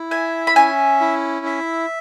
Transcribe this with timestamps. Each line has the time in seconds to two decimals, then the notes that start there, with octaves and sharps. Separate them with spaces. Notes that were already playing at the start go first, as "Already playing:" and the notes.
Already playing: E4
0.11 E5 G#5
0.47 B5
0.56 C#4 G#5
1.01 E4
1.46 E5